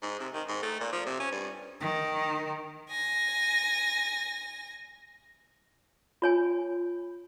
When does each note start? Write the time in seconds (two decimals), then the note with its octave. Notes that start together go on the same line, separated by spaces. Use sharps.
0.02 G#2
0.19 C3
0.33 D#3
0.48 G#2
0.62 A3
0.80 A#2
0.92 F3
1.06 C3
1.20 C#4
1.32 G2
1.81 D#3
2.90 G#5 A#6
6.22 F4 C#5 G#5